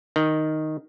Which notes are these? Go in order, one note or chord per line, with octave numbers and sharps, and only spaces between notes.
D#3